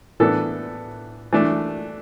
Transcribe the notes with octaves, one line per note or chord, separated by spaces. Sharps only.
A2 E3 B3 D4 A4
E3 A3 D4